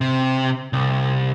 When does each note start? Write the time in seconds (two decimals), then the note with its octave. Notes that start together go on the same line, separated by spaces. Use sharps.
0.01 C3
0.73 C2